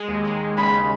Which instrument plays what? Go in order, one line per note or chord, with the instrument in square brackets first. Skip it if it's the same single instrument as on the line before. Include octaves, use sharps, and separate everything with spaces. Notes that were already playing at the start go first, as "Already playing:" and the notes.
Already playing: [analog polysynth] G#3
D#2
G#3
D#2
[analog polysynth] C#3 [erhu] B5